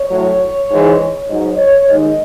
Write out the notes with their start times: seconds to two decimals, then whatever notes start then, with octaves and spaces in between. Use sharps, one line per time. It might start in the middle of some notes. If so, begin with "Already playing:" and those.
Already playing: C#5
0.10 A2 F#3
0.69 G#2 E3 G#3
1.29 G#2 F#3 D#5
1.57 C#5
1.88 D#2 D#3 G#3 D#5